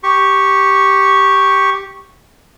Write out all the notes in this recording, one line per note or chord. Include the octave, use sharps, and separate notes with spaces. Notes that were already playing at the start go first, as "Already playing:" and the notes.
G4 C#6